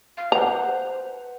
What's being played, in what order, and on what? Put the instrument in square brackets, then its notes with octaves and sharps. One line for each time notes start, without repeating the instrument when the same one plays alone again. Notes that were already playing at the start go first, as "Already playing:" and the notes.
[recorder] F5
[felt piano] B4 F#5 [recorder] C5 [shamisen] A#5